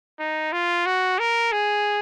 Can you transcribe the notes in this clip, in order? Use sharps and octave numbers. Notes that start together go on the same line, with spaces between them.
D#4
F4
F#4
A#4
G#4